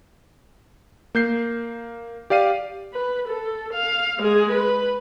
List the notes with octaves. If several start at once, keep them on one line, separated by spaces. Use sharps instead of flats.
A#3 G6 C7
G4 D5 F5 C7 D#7
B4
A4
F5
G#3 G#4
B4